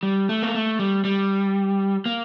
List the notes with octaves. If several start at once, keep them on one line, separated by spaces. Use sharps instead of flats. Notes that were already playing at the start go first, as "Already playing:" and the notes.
G3
A3
A#3
A3
G3
G3
A#3